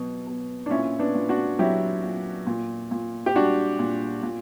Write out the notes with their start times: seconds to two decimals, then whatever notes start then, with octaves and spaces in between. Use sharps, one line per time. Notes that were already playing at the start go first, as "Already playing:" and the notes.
Already playing: B2 F#3
0.27 B2
0.66 D4
0.70 A#2 C#4 E4
0.99 B3 D4
1.15 A#2
1.29 D4 F#4
1.59 F#3 E4 G4
2.03 A#2
2.47 A#2
2.91 A#2
3.26 G4
3.35 G3 D4 F#4
3.79 A#2
4.23 A#2